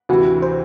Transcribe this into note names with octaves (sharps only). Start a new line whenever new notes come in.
D2 C3 E3 F#4
C5